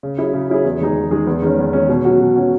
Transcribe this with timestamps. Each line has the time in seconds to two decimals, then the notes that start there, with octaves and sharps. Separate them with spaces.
0.03 C#3
0.17 F#3 C#4 E4 G#4
0.33 C#3
0.49 F#3 C#4 E4 G#4
0.64 E2
0.80 D#3 G#3 D#4 G#4
0.96 E2
1.11 D#3 G#3 D#4 G#4
1.27 E2
1.42 D#3 G#3 C#4
1.59 E2
1.73 D#3 G#3 C#4
1.89 B2
2.05 F#3 C#4 F#4
2.21 B2
2.36 F#3 C#4 F#4